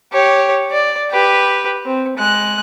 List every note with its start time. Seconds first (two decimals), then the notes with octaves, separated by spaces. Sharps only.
0.12 G4 C#5
0.71 D5
1.11 G4 B4
1.85 C4
2.17 G#3 F#6